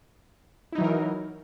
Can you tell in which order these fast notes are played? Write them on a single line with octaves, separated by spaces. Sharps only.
E4 D#4 F#3 E3 A#4